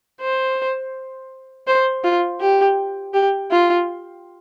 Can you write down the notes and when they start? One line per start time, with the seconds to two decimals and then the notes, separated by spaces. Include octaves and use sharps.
0.21 C5
1.67 C5
2.04 F4
2.41 G4
3.14 G4
3.51 F4